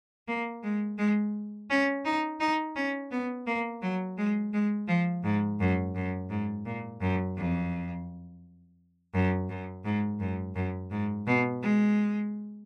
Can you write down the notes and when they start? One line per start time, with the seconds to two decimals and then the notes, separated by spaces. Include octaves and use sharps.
0.27 A#3
0.63 G#3
0.98 G#3
1.70 C#4
2.05 D#4
2.40 D#4
2.76 C#4
3.11 B3
3.46 A#3
3.82 F#3
4.18 G#3
4.53 G#3
4.88 F3
5.24 G#2
5.60 F#2
5.95 F#2
6.30 G#2
6.65 A#2
7.01 F#2
7.36 F2
9.14 F#2
9.49 F#2
9.84 G#2
10.20 F#2
10.55 F#2
10.91 G#2
11.27 B2
11.62 G#3